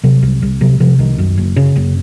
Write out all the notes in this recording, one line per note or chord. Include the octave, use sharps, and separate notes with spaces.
C3 F#3
C2
C2
C3 F#3
C3 F3
C2 D#3
F#2
F#1
C#3
F#1